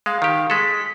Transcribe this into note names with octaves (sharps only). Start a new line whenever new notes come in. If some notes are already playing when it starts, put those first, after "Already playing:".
G#3 F5
D#3 G4
G#3 A4 B6